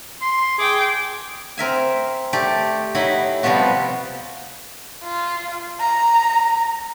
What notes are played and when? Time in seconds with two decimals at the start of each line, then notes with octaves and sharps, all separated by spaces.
0.22 C6
0.59 G#4 G5 D6
1.57 C4 A#4 E5 G#5
2.33 A3 G4 D5
2.95 F#3 D#4 E4 D#5 B5
3.43 C3 F3 G3 B3 F#4
5.04 F4
5.80 A#5